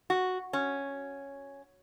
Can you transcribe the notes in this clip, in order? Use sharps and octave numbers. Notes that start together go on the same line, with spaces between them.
F#4
C#4